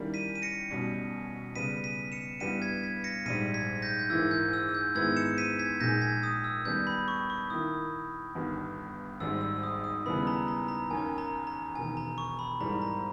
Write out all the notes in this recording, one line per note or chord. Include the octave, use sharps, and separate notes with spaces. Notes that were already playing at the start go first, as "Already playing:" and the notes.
Already playing: D#3 G3 A#3 C#4 E4
B6 D#7
D#7
A#6 C#7
B1 B2 G3 C#4
C#3 G3 B3 B6 D#7
B6 D#7
C#7 E7
G2 G3 B3 E4 B6 D#7
G#6 B6
G#6 B6
A#6 C#7
A#1 G#2 G3 B6 D#7
G#6 B6
G6 A#6
G6
G#2 E3 A#3 E4 E6 G#6
G6
E6
G6
G#2 D#3 G#3 B3 E4 E6 G#6
C#7 E7
B6 D#7
G#6 B6
A#1 A#2 G#3 D#4 G#4 G6 A#6
G#6 B6
D#6
E6
D#2 D#3 G3 B3 G6
B5
C#6
C#6
D#3 A#3 E4 D#6
G1 G2 D#3
G#1 G#2 G3 E6
E6
D#6
D#6
D#2 C#3 G3 B3 E4 B5
A#5
A#5
A#5
D#2 D#3 A#3 C#4 G#5
A#5
A#5
E1 D#2 D#3 G#5
A#5
C#6
B5
G#2 E3 G3 A#3 A#5
A#5